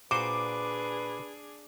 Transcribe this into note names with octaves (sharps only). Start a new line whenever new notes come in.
A#2 D4 F#4 G#4 B4 C5 D6